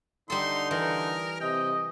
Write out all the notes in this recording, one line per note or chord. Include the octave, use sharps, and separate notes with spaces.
D3 G3 D#4 A4 C6
E3 A#4
C3 D#5 G5